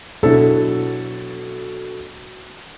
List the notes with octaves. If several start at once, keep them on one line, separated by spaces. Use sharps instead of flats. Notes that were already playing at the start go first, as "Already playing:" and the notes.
B2 F#3 D4 E4 A4